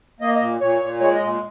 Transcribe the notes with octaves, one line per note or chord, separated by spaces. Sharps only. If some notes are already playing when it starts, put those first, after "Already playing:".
A#3 D#5
D#5
A#2
A#2 C#5
A#2
G#3 C#5
D#5
A#2